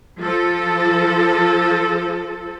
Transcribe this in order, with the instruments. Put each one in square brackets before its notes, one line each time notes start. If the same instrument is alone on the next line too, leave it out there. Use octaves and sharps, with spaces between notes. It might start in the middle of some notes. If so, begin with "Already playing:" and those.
[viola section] F3 A4